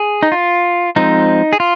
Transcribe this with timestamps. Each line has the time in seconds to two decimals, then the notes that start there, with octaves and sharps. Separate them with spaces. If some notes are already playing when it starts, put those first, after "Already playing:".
Already playing: G#4
0.23 D#4
0.32 F4
0.96 F3 G#3 C4 D#4
1.53 G#4
1.60 F4